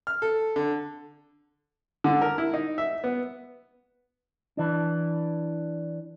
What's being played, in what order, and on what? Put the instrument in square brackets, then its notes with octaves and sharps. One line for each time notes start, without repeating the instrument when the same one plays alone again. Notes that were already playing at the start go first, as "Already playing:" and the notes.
[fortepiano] F6
A4
D3
D3
A#4
E4
D#4
E5
B3
[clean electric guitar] E3 D4